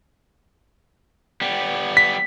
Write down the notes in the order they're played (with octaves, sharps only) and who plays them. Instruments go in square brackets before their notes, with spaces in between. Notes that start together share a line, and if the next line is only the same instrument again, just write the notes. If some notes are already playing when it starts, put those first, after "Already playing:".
[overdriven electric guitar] G3 B3
[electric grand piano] B6